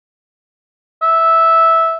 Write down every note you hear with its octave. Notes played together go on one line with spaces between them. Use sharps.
E5